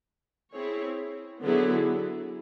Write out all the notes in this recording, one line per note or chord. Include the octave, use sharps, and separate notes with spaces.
C4 E4 G#4 C#5
D3 F#3 B3 E4 G#4